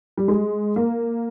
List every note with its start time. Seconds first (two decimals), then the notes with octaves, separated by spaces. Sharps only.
0.17 G3
0.28 G#3
0.76 A#3